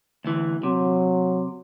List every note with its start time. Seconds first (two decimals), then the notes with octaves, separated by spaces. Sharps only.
0.25 D2 E3
0.63 C3 F#3